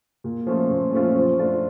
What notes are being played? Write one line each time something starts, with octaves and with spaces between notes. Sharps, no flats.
A#2
F3 A3 C#4 F4
A#2
F3 A3 C#4 F4
F3
A3 D4 F4